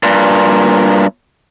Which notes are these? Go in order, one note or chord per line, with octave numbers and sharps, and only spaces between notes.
G2 A#2